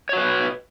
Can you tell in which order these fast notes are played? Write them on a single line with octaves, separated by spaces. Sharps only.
C#5 F#4 B4